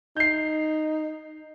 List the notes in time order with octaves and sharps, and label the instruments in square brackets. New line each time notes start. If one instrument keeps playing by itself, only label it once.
[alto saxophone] D#4 [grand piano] G6 C7